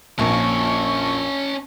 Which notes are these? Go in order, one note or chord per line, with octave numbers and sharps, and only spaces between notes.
A#1 F2 A#2 A#3 C#4 A5 C#6